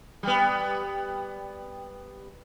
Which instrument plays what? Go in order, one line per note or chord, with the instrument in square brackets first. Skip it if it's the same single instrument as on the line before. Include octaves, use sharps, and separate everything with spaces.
[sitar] G3 B3